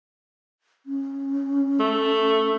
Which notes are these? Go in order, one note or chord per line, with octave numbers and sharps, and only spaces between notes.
C#4
A3